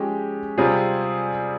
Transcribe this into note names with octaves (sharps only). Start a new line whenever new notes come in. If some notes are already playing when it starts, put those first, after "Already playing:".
Already playing: F3 G#3 C#4 G4
C3 G3 C4 F4 G#4